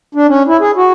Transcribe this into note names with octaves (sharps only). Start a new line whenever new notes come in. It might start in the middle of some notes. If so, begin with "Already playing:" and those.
D4
C#4
E4
G#4
F#4